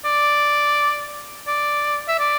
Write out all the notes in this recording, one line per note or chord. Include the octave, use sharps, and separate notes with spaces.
D5
D5
E5
D5